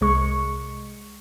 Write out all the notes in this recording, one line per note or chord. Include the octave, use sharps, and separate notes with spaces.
C2 G#3 C#6